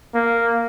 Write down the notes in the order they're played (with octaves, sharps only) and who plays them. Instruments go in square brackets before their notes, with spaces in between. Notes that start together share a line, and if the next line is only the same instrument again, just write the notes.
[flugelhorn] A#3